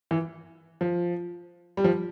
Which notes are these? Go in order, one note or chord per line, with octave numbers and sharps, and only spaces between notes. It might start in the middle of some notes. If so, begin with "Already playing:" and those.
E3
F3
G3
F3